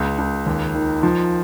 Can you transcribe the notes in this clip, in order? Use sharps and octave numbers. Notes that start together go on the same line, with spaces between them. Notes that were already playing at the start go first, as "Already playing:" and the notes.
Already playing: C#2
C#2
D#2
D#3
F3